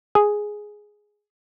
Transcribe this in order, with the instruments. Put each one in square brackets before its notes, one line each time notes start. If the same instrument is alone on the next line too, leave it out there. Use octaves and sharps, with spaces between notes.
[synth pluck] G#4